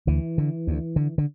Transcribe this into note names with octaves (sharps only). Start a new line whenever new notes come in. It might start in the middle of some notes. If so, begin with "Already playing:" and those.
D2 E3
D3
D2
D3
D3